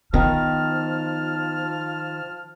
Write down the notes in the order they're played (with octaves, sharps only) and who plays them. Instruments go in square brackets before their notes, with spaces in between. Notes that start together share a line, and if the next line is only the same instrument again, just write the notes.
[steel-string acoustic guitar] D#3 [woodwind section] F3 A5 F6 [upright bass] B3